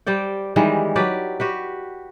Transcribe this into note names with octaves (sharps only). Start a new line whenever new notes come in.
G3 C5 D5 G5
D#3 E3 G3 G#3
F#3 G4 B4 D5
F#4 G4 B4